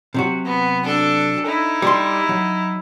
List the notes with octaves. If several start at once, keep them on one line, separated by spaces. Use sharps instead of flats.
C3 F#3 F#4
B3
D4 A4
D#4 E4
G3 B5 C6
F#3